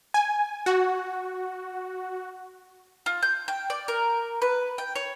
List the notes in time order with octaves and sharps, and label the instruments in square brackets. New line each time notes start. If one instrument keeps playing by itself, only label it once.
[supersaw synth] G#5
F#4
[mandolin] F4
G6
G5
D5
A#4
B4
G5
C#5